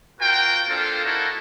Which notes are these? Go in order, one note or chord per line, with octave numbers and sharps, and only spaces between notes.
F4 F#4 A#4 C5 G5
A#3 C4 D4 F4 A4 C5
A#3 D#4 E4 F#4 A4 A#4